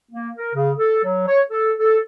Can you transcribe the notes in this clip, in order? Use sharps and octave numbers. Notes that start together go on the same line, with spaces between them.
A#3
A#4
C#3
A4
F#3
C#5
A4
A4